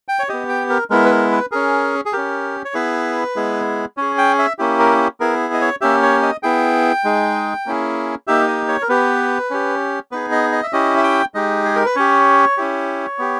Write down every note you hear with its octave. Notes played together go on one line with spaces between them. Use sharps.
G5
C#5
B3 G4 D#5
G5
A#4
G#3 B3 E4 A#4
B4
A#4
B4
C#4 G#4 A#4
G#4
C#4 G4 A#4
C#5
B3 E4 G#4 B4
G#3 B3 E4 G#4
C#4 G#4 C#5
G5
E5
A#3 C#4 E4 G4
A#4
B3 E4 G#4 A#4
D#5
C#5
A#3 C#4 G4 E5
C#5
D#5
B3 E4 G#4 G5
G#3 D#4 G#4
A#3 C#4 E4 G#4
A#3 D#4 G4 E5
D#5
C#5
A#4
B3 G4 B4
C#4 G4
B3 D#4 G#4 B4
D#5
D#5
E5
C#4 E4 G4 D#5
E5
G5
G#3 D#4 G4 D#5
G#4
A#4
B4
C#4 G4 C#5
C#4 E4 G4
B3 G4